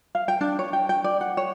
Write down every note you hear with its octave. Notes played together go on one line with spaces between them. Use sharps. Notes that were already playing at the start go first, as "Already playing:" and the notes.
F5
G5
D4
C#5
G5
G5
D5
F#5
C#5